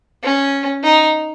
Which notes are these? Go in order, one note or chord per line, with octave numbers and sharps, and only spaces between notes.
C#4
D#4